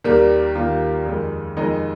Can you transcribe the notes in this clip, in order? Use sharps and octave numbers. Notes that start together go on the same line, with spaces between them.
D#2 D#3 G3 A#3 G4
D#2 D#3 G3 A#3 F4
F2 D#3 G#3
F2 D#3 G#3 D#4